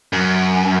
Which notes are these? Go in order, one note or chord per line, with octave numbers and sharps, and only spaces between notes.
F#2